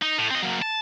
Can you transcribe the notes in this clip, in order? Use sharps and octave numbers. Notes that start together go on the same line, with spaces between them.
D#4
A2
C4 D#5
F#3 A#3
A5